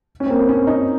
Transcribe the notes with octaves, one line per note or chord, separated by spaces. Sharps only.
C#4
C4
A#3
C4
C#4
D#4